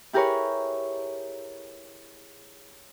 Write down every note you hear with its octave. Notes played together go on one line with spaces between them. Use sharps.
E4 G4 G#4 A#4 B4 C#5